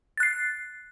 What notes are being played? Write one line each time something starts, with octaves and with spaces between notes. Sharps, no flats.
F#6 A6 C7